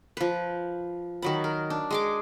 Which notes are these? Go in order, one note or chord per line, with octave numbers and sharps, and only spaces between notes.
F3 B4
D#3 F#3 B5
A#4
D4
G#3 G#4 D6